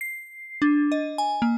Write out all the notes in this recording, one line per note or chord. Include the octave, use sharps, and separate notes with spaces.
C7
D4
D#5
G#5
A#3